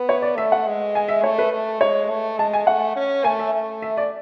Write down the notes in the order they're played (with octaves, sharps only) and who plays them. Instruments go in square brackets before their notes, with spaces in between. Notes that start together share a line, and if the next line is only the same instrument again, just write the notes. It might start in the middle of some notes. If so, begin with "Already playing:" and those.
Already playing: [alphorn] B3
[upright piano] C#5
D5
[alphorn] A3 [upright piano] E5
[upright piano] F#5
[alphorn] G#3
[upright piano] G#5
E5
[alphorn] A3 [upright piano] C#5
[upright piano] B4
[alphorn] A3
[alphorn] G#3 [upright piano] C#5
[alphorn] A3
[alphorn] G#3 [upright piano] A5
[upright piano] G#5
[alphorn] A3 [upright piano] F#5
[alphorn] C#4
[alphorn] A3 [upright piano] G#5
[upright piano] E5
[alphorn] A3
[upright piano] E5
D5